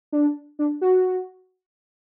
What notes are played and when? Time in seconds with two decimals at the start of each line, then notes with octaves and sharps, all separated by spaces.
0.12 D4
0.59 D4
0.81 F#4